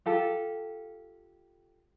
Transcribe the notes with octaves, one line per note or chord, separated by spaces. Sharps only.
F4 G4 A4